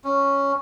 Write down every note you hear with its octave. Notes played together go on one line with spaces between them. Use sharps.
C#4